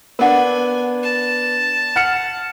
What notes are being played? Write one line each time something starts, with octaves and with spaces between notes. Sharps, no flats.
B3 D4 A#4 F#5 G#5
A5
F#5 F6 C#7